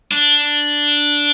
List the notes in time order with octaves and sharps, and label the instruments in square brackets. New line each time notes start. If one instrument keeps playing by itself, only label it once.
[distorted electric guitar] D4